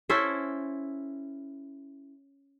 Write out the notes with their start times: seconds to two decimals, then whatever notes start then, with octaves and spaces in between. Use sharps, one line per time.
0.09 C#4 E4 A4 C5